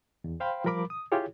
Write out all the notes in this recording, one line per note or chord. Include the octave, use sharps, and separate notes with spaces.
E2
C5 F5 G5 B5 C6
F3 G3 A#4 B5 D6
D#6
E4 F4 G4 G#4 C#5